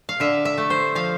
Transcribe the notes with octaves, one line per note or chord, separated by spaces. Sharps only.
F5
D3 E5
E5
A3
C5
F3 F5